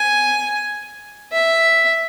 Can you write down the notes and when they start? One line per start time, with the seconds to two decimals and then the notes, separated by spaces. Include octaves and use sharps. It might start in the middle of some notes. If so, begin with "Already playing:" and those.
Already playing: G#5
1.32 E5